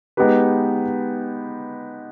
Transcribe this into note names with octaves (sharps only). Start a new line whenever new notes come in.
G#3 B3 D#4 G4 B4